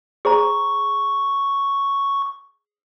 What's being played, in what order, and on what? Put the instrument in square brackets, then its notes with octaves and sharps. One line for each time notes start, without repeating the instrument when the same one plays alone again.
[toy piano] G#4 C5 A#5 [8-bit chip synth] C#6